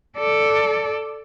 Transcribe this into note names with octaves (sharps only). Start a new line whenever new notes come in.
A4 D5